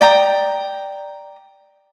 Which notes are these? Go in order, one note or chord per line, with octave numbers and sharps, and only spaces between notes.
D5 G5 A#5 D#6